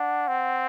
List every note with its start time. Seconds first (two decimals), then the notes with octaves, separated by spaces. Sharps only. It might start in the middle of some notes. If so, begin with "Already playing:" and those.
Already playing: D4 F#5
0.28 C4